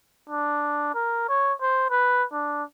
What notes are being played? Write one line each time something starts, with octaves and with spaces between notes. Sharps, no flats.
D4
A#4
C#5
C5
B4
D4